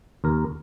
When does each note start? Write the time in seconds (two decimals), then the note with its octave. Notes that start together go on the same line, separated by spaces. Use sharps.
0.24 D#2 A#4